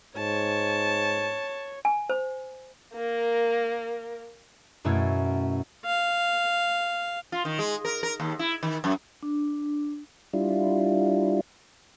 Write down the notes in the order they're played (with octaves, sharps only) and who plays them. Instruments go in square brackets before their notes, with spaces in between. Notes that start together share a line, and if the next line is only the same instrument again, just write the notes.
[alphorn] G#2 [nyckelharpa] C#5 [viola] A5
[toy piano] G#5
C5
[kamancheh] A#3 A#4
[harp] F#2 B2 A3 C#4 E4
[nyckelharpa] F5
[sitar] F4
D#3
G#3
A#4
A#4
D#2
E4
D#3
F#2
[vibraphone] D4
[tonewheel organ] G3 D4 E4 F4